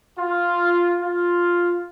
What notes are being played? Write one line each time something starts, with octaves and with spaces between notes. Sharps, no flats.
F4
F4